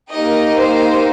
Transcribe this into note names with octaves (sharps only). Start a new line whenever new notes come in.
A#3 D#4 G4 D#5
C5